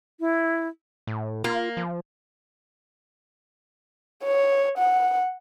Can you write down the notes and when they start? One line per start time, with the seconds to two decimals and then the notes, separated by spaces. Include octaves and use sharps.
0.20 E4
1.07 A2
1.44 A#3 F4
1.77 F3
4.23 C#5
4.77 F#5